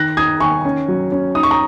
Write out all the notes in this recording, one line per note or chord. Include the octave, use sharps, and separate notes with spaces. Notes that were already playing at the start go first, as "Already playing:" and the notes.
Already playing: D#3 F#6 A#6
D#4 D#6 G#6
D#3 G#5 C#6
C#4
F#3
C#4
D#4 D#6
C#6
A#5 D#6